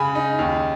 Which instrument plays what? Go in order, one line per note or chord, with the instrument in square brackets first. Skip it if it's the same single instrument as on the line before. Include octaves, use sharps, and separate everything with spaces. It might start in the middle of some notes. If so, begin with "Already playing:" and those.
Already playing: [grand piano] C#3 G#5 B5
D#4
D#2